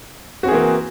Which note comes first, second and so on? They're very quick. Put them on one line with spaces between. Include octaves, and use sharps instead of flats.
F#4 C4 G#4 E3 A#3